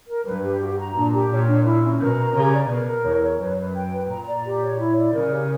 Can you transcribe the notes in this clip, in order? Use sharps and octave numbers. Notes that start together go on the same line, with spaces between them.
A#4
G2 B4
G4
F#4
A#5
A#2 D4
G4
A#2 C#5
D4
E4
C#4
B2 A#4
A#5
C#3 G4
D5
B2 A#4
A#4
E2 C#5
C#5
F#2 B4
B4
G5
B4
A#2 A#5
D5
G4
C#5
E4
D5
C#3 A#4
G4